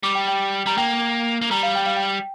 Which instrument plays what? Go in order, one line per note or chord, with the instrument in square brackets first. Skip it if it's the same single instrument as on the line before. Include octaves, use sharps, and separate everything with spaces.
[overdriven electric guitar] G3 [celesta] D6
[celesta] G5
G5
[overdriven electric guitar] G3 [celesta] A#5
[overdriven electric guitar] A#3 [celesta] G5
[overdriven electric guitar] A#3
[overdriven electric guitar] G3 [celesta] A#5
[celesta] F5
G5
F5
G5